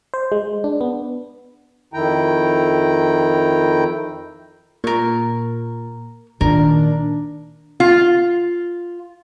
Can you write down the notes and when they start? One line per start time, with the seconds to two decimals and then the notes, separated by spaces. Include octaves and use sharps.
0.14 C5
0.32 G#3
0.64 D4
0.81 B3
1.94 F2 D#3 E4 G5 A#5
4.84 A#2 A#4 C#6
6.41 A#2 D#3 D4 A#4
7.80 F4